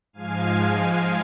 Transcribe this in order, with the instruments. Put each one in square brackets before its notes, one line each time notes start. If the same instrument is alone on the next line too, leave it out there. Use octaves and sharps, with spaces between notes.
[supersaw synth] G#2 F3 G#3 F5 G#5